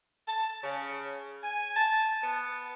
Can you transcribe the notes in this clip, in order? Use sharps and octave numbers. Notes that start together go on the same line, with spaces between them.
A5
C#3
G#5
A5
B3